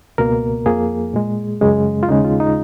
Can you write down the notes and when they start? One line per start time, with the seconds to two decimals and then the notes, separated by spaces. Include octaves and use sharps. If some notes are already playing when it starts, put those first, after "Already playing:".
0.18 C#2 B2 A#3 A#4
0.66 F2 F3 A#3 G#4
1.14 A#2 G#3
1.61 F#2 C#3 G#3
2.03 F4
2.09 D#2 C#3 G#3 D#4
2.24 F4
2.40 D#4